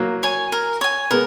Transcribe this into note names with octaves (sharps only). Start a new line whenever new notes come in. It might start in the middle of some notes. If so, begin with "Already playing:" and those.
Already playing: F#3 A#3
C#5 G#5
A#4
C#5 G#5
G#3 B3 A#4